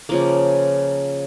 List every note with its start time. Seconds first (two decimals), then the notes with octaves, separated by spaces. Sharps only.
0.09 C#3 F3 A#3 D6